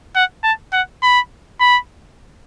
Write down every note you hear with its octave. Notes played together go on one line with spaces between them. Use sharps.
F#5
A5
F#5
B5
B5